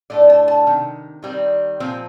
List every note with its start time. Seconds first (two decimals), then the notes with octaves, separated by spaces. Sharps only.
0.10 A2 A3 D4 D5
0.30 A5
0.48 A5
0.67 C3 D#3
1.23 D#3 G3 C4
1.80 A#2 F3 C4